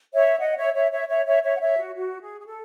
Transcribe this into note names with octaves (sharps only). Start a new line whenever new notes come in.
C#5 E5
D#5 F#5
C#5 E5
C#5 E5
C#5 E5
C#5 E5
C#5 E5
C#5 E5
F#5
C#5 E5
F#4
F#4
G#4
G#4
A4